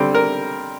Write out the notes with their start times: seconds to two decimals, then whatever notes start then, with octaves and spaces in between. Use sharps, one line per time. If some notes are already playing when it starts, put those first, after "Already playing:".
Already playing: D3 G3 C4
0.15 A#4